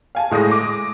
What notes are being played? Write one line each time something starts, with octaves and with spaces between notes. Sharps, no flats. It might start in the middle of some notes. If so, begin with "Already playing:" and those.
F5 G#5 A5
A2 G#3 D#6 A#6
D6